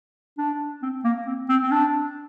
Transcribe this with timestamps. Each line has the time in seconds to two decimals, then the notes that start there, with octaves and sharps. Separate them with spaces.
0.38 D4
0.82 C4
1.04 A#3
1.27 C4
1.50 C4
1.63 C4
1.71 D4